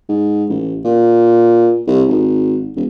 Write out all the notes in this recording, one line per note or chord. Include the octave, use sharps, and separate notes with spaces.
G#2
A1
A#2
C2
G#1
E1